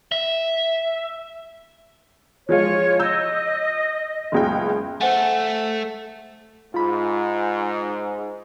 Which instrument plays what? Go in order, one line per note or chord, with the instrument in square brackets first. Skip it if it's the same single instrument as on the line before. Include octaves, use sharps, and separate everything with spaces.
[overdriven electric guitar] E5
[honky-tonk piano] F3 G#3 F4 [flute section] C#5
[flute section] D#5 [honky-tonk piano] E6 G6
[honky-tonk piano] F#1 C#2 G5
[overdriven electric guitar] A3 [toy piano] C5 F#5 G#5
[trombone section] G#2 [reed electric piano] F4 B5